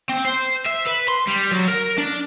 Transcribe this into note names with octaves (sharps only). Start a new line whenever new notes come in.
C4
C5
E5
B4
C6
G3
F#3
A#4
D4